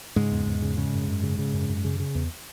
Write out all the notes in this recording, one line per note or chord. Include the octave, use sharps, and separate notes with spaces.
G#2 C#3 G#3
E2
E2
C#3
C#3
F#2
F#2
C#3
C#3
F#2
F#2
C#3
C#3
E2